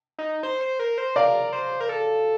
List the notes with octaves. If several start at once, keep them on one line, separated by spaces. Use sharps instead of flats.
D#4
C5
C5
A#4
C5
A#4 D5 F5
C5
A#4
A4